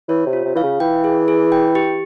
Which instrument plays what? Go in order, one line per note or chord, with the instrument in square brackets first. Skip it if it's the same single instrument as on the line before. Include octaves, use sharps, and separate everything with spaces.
[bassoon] E3 [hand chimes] C#5
[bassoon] C3
[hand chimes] F4
[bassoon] C3
[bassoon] E3 [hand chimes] F5
[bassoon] C#3
[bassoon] E3 [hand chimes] G5
[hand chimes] G#4
G#4
G5
G4